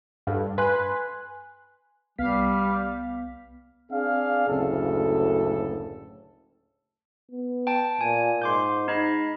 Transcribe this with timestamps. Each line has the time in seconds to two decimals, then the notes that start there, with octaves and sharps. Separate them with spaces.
0.27 G2 A4 F5
0.58 B4 G#5 C6 F#6
2.18 C2 G3 B3 F5 B6
3.91 C4 D4 G#4 F5
4.48 F#1 D2 A2 C#3 A4
7.31 B3
7.67 G5 A5
8.01 A#2 G#5
8.42 G#2 C6 D6 G6
8.88 D#4 D#5 B5